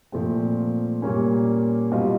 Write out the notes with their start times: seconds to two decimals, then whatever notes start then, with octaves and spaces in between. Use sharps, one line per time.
0.12 A#2 F3 A3 C4
1.02 A#2 G3 A#3 C#4
1.92 B2 G3 C4 F4